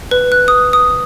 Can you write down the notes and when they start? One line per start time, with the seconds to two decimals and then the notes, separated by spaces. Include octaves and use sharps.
0.11 B4
0.32 F#6
0.48 D#6
0.73 D#6